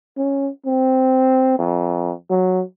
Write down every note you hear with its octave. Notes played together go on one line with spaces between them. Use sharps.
C#4
C4
F2
F#3